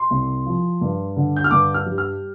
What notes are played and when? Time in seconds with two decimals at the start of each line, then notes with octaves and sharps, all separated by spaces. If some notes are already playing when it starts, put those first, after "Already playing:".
Already playing: C6
0.11 C2
0.46 F3
0.81 G2
1.17 D3
1.36 G6
1.44 F6
1.51 G2 D6
1.74 F6
1.86 G3
1.98 F6